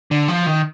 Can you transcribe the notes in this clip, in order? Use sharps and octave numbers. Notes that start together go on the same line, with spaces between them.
D3
F3
D#3